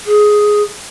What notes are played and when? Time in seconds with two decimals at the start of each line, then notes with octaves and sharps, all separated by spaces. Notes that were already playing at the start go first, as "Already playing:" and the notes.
0.06 G#4